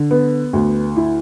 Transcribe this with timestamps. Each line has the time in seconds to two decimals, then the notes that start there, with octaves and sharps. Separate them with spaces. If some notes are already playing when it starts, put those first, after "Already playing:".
Already playing: D3
0.11 B3
0.53 D2
0.96 E4